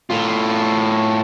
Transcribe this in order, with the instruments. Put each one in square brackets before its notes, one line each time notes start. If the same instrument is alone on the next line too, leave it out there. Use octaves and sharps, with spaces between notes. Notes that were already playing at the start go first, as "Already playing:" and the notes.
[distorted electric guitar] A2 F4